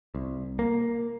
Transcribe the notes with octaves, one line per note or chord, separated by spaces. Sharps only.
C2
A#3